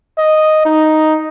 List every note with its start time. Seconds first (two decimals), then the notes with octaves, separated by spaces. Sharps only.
0.18 D#5
0.65 D#4